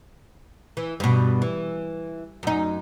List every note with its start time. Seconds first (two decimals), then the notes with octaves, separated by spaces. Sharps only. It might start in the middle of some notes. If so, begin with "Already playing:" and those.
0.77 E3
1.00 G2 B2
1.42 E3
2.43 F#2 D#4